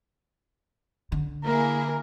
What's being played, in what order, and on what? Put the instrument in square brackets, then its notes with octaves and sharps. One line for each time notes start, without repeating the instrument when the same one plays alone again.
[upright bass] D3
[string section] A#3 E4 G#4 [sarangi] A#4